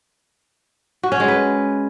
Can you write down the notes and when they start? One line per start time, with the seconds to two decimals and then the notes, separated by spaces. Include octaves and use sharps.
1.03 F#4
1.12 C#4
1.20 G#3
1.28 B4